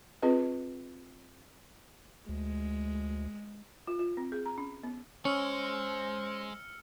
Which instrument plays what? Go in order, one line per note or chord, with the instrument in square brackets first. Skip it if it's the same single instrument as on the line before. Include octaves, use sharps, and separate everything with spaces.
[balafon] C4 F4 G#4 B4 D#5
[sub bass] D2 [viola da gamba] G#3
[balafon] F4
F4
C4
G#4
A#5
C#4
B3
[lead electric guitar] G#3 [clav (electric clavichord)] C#4 [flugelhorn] C5 [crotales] E6 F6 C#7